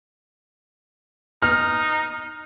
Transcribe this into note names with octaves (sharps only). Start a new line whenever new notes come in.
D#4 F6